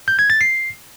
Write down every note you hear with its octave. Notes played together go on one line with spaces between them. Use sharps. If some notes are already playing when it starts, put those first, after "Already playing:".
G6
G#6
A6
C7